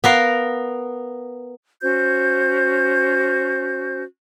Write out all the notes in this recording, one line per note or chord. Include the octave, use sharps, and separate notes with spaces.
B3 A#4 F5
C#4 F#4 C5 G6